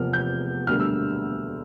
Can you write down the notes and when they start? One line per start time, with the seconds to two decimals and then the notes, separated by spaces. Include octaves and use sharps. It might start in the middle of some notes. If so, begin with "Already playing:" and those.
Already playing: F1 E2 C3 F3 A#3 F6
0.13 G6
0.67 E1 D2 D3 G3 A#3 F6
0.80 E6